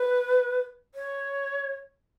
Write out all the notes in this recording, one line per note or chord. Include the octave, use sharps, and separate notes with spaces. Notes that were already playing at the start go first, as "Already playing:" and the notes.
Already playing: B4
C#5